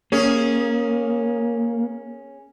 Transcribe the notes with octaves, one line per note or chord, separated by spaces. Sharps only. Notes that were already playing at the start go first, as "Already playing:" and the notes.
A#3 C#4 G#4